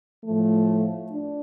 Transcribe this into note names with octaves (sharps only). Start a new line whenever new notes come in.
A2 F3 A3
D4